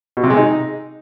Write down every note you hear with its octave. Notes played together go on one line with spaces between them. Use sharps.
B2
C3
G#3
D#4